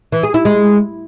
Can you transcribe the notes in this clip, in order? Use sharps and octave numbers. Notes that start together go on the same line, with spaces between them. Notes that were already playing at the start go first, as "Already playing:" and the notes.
E3
G#4
E4
G#3